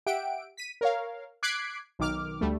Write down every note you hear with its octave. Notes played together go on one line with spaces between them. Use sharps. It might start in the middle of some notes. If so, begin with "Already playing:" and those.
G4 E5 F#5 G5 D7
B6 D#7
A#4 C#5 F5
D6 F#6 G#6 B6 C7 D7
B1 D#3 D6 F6
D2 G3 A3